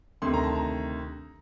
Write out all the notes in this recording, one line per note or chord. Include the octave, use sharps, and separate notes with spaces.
D2 C3 D#3 C6
A#5
A5
A#5